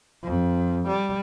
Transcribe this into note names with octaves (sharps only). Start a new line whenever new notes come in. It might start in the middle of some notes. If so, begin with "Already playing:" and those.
F2
G3